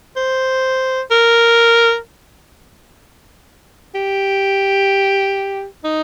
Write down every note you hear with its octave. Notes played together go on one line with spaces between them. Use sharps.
C5
A#4
G4
D#4